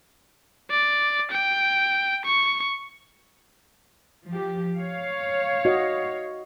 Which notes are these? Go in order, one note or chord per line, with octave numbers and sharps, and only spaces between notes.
D5
G5
C#6
F3 G4
C#5 F5
F#4 D#5